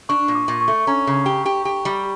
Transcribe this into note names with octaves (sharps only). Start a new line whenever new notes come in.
D4 C#6
A#2
D6
A#2
C#6
A3
C#4 A#5
C#3
G4
G4
G4
G3